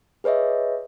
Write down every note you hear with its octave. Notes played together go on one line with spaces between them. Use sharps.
G#4 B4 C#5 D#5 E5